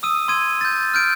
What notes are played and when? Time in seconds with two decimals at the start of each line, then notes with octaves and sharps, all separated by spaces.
0.03 D#6 E6 D#7
0.28 C6 E6 G#6 D#7
0.61 G6 A6
0.94 F6 G6 D7